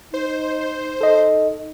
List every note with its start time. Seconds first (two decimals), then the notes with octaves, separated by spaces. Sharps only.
0.14 D#4 C5
1.01 D#4 A4 D#5